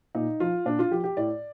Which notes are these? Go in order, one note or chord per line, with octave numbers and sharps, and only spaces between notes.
A#2 D#4
F3 F4
A#2 D4
F4
F3 G4
G4
A2 D5